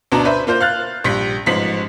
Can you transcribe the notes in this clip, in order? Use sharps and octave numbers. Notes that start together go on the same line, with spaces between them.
D2 B2 D4 A#5
B4 C5 E5
A#3 F4 C5 G6
F5 F6 F#6 A6
A#1 G3 B6
A1 G#2 F3 B6 F#7